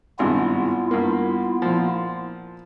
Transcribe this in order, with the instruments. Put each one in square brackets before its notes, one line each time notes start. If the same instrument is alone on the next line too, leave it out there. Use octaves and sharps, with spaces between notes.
[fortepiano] G#1 G2 C3 [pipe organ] B3 E4 F4
[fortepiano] G2 A#3
A#2 F3